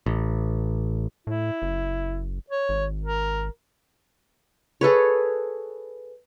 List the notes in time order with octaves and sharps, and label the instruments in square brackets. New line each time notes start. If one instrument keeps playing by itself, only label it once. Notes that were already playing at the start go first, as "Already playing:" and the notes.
[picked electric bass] A1
[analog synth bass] A2 [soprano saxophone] E4
[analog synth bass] F#1
[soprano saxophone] C#5
[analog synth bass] G#1
[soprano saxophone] A#4
[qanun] G#4 A4 B4 C#5